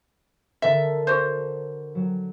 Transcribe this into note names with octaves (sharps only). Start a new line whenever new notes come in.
D3 A4 A#4 E5
F#4 C5
F#3